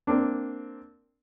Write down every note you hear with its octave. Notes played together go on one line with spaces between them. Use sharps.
A#3 C4 D4